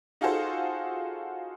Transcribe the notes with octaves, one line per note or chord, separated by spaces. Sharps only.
D#4 F4 F#4 G#4 A4 C5